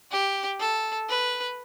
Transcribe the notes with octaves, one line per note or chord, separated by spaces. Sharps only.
G4
A4
B4